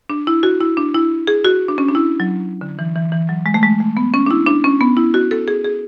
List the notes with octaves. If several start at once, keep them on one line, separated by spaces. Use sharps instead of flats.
D4
E4
F#4
E4
D4
E4
G#4
F#4
D4
C#4
D4
E4
F#3
D3
E3
E3
E3
F#3
G#3
A3
G#3
A3
B3
C#4
D4
E4
D4
C#4
B3
E4
F#4
A4
G#4
G#4